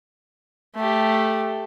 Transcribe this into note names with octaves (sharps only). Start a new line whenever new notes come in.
A3 G4